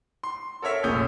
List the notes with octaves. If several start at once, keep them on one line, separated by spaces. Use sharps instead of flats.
C6
A4 A#4 C#5 E5
F1 A#1 C#4 G#4 D#6 G6